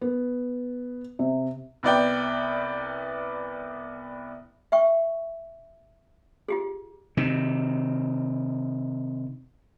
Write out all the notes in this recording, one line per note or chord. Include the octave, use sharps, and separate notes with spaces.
B3
C3
C2 B3 D5 G5
E5 G5 C#6
F4 G4 G#4
C3 D#3